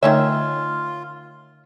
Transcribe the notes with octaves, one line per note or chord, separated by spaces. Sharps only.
D3 D#3 A3 C#4 D#4 F4 C#5 E5